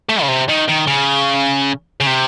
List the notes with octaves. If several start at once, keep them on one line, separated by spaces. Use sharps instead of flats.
A3
C#3
C3
D#3
D#3
C#3
C#3
C3